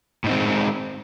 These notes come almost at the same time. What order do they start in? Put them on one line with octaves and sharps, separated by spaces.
A2 D#4 C4 G#3